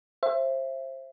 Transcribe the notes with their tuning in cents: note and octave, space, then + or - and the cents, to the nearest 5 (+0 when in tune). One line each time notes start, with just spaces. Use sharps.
C5 +25 E5 +25